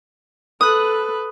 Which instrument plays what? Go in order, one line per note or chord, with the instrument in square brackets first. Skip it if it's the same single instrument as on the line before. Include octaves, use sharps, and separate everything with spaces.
[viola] A4 B4 [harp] D#6 F#6